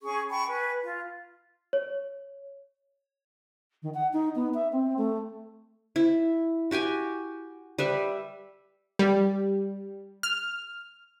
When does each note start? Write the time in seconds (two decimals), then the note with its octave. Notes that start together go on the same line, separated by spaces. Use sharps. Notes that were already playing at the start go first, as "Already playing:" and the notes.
0.02 C#4 G#4 C#6
0.29 G5 A5 B5 C#6
0.48 B4 G#5
0.83 F4
1.73 C#5
3.83 D#3
3.94 F#5
4.13 D#4
4.35 B3
4.54 E5
4.72 C4
4.98 A3
5.96 E4
6.71 F#4 G4 G5 G#5
7.78 G3 B4 E5
8.99 G3
10.23 F6